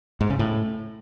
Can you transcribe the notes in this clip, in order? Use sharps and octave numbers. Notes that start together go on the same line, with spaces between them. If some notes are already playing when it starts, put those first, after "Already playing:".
G#2
C#3
A2